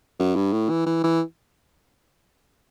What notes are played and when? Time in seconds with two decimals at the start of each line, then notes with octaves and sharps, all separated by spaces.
0.20 F#2
0.36 G2
0.53 A2
0.70 E3
0.86 E3
1.04 E3